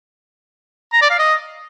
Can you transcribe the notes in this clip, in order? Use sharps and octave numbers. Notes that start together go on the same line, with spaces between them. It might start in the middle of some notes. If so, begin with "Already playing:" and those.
A#5
D5
F5
D#5